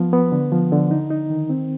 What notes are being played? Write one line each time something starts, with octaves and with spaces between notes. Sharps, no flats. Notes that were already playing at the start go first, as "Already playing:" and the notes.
Already playing: F3 B3
B3
D3
F3
D3
D#4
D#4
D#3
C4